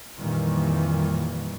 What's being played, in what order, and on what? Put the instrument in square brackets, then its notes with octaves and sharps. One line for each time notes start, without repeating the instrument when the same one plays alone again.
[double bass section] F2 A#2 D#3 E3 G3